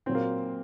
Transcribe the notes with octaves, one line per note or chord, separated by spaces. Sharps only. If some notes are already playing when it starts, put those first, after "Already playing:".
A#2 F#3 C4
A#3